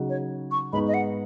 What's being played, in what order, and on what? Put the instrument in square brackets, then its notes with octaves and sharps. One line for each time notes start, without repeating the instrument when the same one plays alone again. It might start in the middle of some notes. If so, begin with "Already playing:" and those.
Already playing: [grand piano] C#3 F#3 D#4 F#4
[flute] C#5
C#6
[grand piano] G#2 G#3 B3 D#4 [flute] B5
[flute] D#5
F#5